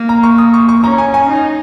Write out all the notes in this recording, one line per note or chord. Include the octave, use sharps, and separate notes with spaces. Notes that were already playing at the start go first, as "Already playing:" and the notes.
Already playing: A#3
A#5
C#6
D#6
C#6
C#6
C#4 A#5
G#5
G#5
D#4